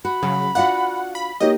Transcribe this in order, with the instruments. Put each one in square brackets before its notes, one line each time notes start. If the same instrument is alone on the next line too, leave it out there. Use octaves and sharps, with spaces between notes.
[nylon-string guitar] F#4 [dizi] B5
[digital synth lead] C#3 [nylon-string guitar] F#3
[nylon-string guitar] D4 F4 F#4 [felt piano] F5 [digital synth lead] F#5
[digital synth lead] B5
[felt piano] A#3 D#4 G4 [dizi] C#5 [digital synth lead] D#5